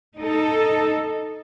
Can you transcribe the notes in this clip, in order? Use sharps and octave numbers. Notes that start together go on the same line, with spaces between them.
D#4 A4